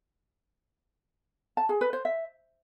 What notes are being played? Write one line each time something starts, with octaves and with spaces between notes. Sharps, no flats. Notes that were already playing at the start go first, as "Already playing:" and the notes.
A5
G#4
B4
C5
E5